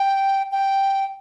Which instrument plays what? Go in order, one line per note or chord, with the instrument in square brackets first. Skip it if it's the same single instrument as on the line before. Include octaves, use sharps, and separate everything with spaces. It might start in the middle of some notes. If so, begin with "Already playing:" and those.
Already playing: [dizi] G5
G5